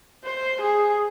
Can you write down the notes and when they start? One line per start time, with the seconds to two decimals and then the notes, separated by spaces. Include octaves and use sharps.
0.24 C5
0.61 G#4